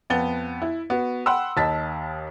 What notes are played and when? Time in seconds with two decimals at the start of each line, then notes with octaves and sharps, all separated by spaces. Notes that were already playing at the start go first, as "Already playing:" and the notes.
0.10 F2 B3 A6 G7
0.62 E4
0.90 B3 F#4
1.26 F#5 G5 B5 C6 E6
1.57 D#2 D#5 A5 A6 B6